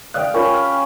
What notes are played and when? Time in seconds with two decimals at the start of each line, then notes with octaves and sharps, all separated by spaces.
0.14 D5 F5 G5 D#6 F#6
0.34 C#4 F4 A#4 G5 B5
0.54 F6